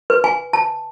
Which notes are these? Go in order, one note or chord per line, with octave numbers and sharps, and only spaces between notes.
B4
G#5
A5